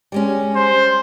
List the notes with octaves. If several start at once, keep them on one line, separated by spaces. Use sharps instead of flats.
G3 G#3 C#4
C5